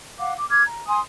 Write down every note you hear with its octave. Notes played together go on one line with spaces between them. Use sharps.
F5 F#5 D6
D6
D6 F6 G#6
A#5
G#5 C6 D#6